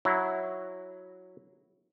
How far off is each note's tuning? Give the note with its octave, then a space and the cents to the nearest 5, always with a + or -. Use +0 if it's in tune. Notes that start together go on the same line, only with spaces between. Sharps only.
F#3 -5 E4 -10